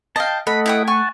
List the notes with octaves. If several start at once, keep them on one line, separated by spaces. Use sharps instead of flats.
D#5 F5 G5 A5
A3 A4 D#5 F#5 B5
E4 G5 D#6
F#5 G#5 A5 C#6